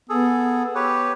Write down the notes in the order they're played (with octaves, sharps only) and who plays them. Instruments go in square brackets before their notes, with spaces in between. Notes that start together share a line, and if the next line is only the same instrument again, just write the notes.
[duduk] B3 [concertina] G#4 A4
[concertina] G4 B4 C#5